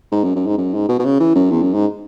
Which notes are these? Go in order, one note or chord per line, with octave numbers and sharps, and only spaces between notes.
G#2
F#2
F#2
G#2
F#2
G#2
B2
B2
C#3
E3
F#2
E2
F#2
G#2